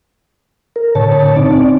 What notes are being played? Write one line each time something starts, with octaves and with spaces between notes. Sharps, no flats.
A#4
A2 D3 C#5 A5
C4 D#4 D5